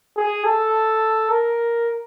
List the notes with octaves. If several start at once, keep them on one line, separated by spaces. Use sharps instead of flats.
G#4
A4
A#4